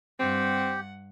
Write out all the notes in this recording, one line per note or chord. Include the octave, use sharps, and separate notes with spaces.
G2 C4 G4 F#5